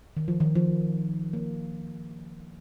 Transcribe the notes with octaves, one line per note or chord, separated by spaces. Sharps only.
D#3
F3
D#3
F3
A#3